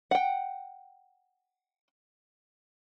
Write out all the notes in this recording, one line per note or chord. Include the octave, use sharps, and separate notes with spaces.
F#5 G5